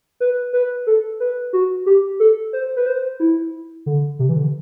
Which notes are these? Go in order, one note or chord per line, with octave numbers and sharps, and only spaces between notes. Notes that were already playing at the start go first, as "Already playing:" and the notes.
B4
B4
A4
B4
F#4
G4
A4
C5
B4
C5
E4
D3
C3
E3
D3